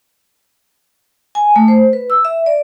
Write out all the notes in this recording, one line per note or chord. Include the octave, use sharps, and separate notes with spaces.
G#5
A3
C5
B4
E6
E5
D5